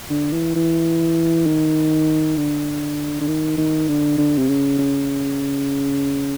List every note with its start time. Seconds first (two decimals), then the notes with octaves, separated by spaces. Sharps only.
0.10 D3
0.32 E3
0.55 E3
1.46 D#3
2.37 D3
3.21 D3
3.27 D#3
3.57 D#3
3.88 D3
4.18 D3
4.37 C3
4.48 C#3
4.78 C#3